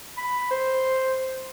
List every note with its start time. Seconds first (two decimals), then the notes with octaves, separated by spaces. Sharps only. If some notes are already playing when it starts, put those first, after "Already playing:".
0.17 B5
0.51 C5